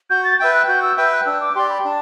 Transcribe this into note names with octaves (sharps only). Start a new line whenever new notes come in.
F#4 G6
A6
B4 E5 G5 G6
F#6
F#4 G6
E6
B4 E5 G5 G6
F#6
D4 E6
D6
G4 D5 C6
B5
D4 A5